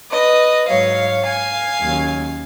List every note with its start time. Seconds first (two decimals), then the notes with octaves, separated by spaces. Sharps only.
0.11 B4 D#5
0.68 G#2 F#3 C#5 F5
1.24 F5 G#5
1.81 D#2 C#3 F#3